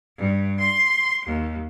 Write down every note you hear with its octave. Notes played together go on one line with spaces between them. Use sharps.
G2
C6
D#2